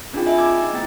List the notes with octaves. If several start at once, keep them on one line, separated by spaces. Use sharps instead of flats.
C4 D4 D#4 F4 G#4 G5
D#5 E5 G#5 B5
D6 E6 G#6
D#4 G#4
A3 B3 C4 E4 G5 A6